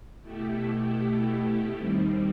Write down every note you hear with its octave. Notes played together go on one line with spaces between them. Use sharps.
B2 A3 E4 G4
D#2 D#3 G3 C4